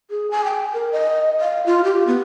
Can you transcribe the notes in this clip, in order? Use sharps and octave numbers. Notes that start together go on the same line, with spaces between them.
G#4
G#5
G5
A#4
D#5
F5
F4
G4
B3